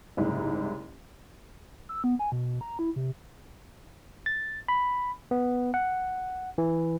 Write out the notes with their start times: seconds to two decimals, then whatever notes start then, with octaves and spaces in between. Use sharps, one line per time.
0.17 F#1 C2 G#2
1.89 E6
2.04 B3
2.19 G#5
2.32 B2
2.61 A#5
2.79 E4
2.96 C3
4.26 A6
4.68 B5
5.31 B3
5.74 F#5
6.58 E3